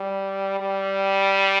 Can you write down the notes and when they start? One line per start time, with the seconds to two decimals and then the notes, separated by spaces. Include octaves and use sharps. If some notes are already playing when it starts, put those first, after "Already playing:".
Already playing: G3
0.60 G3